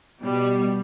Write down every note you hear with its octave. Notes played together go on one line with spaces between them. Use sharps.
B2 G3